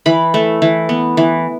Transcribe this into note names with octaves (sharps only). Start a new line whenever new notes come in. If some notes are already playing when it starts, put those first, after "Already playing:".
E3 B5
A3
E3
B3
E3